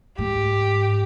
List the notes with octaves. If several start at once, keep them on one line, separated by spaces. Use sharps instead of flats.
G#2 G4